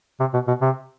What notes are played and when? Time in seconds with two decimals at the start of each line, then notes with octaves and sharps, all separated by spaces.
0.20 C3
0.34 B2
0.48 B2
0.61 C3